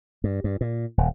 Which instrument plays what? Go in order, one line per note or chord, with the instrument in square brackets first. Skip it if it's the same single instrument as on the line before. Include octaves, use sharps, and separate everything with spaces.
[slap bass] G2
G2
A#2
D#1